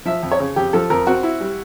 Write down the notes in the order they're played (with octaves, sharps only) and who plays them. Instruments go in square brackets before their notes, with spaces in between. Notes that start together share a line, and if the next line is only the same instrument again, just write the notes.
[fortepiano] F3 E5
F2
C#5
C#3
F2 G4
F3 A4
F2 A#4
C4 F#4
E4
G3